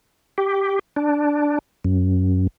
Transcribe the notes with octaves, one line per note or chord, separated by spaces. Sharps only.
G4
D4
F#2